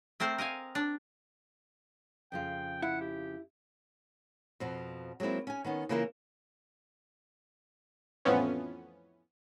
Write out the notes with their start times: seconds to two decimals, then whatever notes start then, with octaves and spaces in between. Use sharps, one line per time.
0.20 A3 C4 A#4 C5
0.38 A#4 D#5 F5 G#5
0.75 D4
2.32 F2 C#3 F4 G5
2.82 E4 F#5
3.01 G4
4.60 F2 B2 F3
5.20 F#3 G#3 A#3 C4 E4
5.47 C#4 G#5
5.64 D#3 B3 C#4
5.89 C#3 E3 A#3 E4 F4 A#4
8.25 F2 A2 E3 F3 B3 C#4